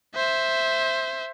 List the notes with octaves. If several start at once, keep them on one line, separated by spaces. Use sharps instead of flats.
C5 E5